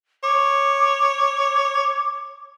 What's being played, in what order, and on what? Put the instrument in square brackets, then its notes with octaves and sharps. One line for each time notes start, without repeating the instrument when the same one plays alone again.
[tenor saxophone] C#5 [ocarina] D6